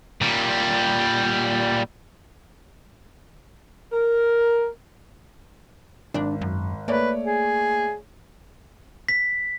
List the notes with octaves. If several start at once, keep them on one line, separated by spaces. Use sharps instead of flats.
A#2 G3
A#4
G#1 D4
F#2
A3 A#3 B4 C#5 D5
G#4
B6